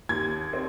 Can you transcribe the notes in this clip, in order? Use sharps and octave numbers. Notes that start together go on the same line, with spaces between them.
D#2 G#6
C4